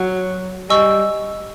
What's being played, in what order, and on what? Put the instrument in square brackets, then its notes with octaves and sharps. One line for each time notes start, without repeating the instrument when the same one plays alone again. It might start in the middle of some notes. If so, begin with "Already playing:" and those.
Already playing: [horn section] F#3
[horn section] G3 [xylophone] D#5 G#5 C#6 E6